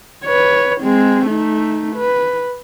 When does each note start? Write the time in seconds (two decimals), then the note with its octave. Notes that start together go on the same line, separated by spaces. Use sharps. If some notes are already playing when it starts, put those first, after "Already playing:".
0.25 B4 C#5
0.81 G#3 C4
1.26 A3 D#4
1.96 B4